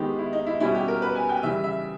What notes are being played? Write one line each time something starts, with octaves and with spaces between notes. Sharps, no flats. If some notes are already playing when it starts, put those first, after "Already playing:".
Already playing: D#3 G#3 B3 G4
E4
D#4
E4
B2 G3 C#4 E4
G4
A#4
B4
G#5
G5
C#3 E3 G3 E5
E5